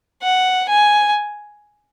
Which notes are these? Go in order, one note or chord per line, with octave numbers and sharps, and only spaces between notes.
F#5
G#5